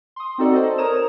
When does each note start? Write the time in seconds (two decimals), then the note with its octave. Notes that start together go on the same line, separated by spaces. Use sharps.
0.16 C6 D#6
0.38 C4 D#4 F#4 A4 D5
0.53 A4 C5 D5 D#5
0.78 A#4 C#5 A#5 D#6 E7